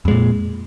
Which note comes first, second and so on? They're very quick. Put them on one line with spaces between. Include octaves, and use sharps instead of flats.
F2 G#3 A#2